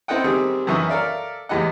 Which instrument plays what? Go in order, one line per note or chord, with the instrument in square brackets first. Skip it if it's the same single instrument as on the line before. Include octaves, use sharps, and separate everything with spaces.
[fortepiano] C4 E4 A4 D#5 F#5 G5
D#3 G3 C4 G4 G#4
F#2 D#3 E3 E5 C#6 D#6
A4 A#4 D5 E5 F5
E2 A2 G#3 G4 D#5 F#5